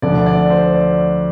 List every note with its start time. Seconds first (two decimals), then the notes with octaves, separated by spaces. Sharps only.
0.02 D2 D3 F3 D5
0.26 D5
0.50 C5
0.74 D5